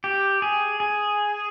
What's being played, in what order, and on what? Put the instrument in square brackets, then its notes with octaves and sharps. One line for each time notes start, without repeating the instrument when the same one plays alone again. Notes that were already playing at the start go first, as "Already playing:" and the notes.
[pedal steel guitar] G4
G#4
G#4